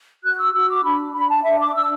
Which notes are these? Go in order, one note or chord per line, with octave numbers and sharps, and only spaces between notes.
F#4 F#6
E6
F#4 E6
D6
D4 B5
D4 B5
A5
D4 E5
D6
D4 E6